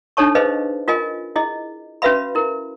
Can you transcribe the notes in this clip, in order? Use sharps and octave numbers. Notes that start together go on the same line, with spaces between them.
D4 D#4 A4 C#5 A5 C#6
G#4 B4 C5 D#5 F5
F4 A#4 D#5 G#5
E4 G#4 D#5
C#4 F#4 B4 E5 F5 B5
E4 A#4